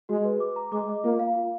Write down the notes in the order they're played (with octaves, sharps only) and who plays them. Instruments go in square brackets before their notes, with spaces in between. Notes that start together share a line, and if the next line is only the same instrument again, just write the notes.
[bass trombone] G#3 [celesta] F#4
[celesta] B4
D6
A#5
[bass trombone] G#3 [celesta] D6
[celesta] D#5
[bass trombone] A#3 [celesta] F4
[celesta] F5
F4